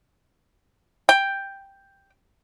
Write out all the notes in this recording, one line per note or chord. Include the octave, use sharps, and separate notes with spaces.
G5